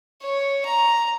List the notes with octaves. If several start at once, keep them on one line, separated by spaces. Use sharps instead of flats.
C#5
A#5